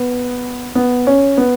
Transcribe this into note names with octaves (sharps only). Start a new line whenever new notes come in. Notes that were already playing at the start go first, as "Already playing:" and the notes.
Already playing: B3
B3
C#4
B3